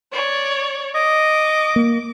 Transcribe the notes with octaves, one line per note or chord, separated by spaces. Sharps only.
C#5 D5
D#5 D6
A#3